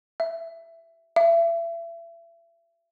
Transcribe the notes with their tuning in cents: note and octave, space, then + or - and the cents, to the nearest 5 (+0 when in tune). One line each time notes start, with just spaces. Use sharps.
E5 +10
E5 +35